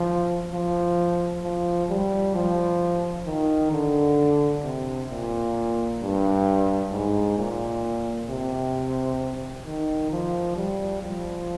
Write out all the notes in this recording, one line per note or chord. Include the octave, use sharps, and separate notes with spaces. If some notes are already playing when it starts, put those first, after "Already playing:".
Already playing: F3
F3
F3
G3
F3
D#3
D3
C3
A#2
G2
G#2
A#2
C3
D#3
F3
G3
F3